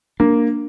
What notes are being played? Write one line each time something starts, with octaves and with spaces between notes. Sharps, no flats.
A#3 D4